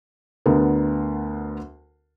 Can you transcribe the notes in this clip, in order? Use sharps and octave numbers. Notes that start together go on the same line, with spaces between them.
D2 D3 B3 A#4